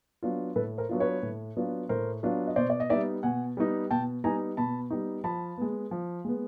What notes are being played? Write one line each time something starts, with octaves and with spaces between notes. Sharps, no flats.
F#3 B3 D4 F4
A2 A4 B4
A#4 C5
F#3 B3 D4 F4
B4 C#5
A2
F#3 B3 D4 F4
A2 A#4 C5
F#3 B3 D4 F4
D#5
B2 C5 D5
D5
D#5
G3 B3 D#4 D5 E5
B2 F#5 G#5
G3 B3 D#4
B2 G5 A5
G3 B3 D#4 G#5 A#5
B2 A5 B5
G3 B3 D#4
F3 A5 B5
G#3 B3
F3
G#3 B3